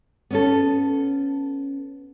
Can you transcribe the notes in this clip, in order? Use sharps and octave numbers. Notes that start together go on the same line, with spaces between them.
B3 C#4 A4